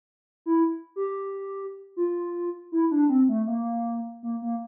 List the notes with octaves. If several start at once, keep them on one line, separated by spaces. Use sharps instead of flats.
E4
G4
F4
E4
D4
C4
A3
A#3
A#3
A#3